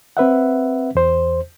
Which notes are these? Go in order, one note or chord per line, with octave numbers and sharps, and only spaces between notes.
C4 B4 E5 F#5
E2 C5